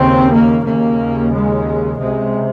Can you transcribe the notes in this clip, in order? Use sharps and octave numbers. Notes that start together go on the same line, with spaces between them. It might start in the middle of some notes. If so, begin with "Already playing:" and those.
Already playing: D#2 C#3 C4
A#3
D#2 C#3 A#3
G#3
C#2 C3 G#3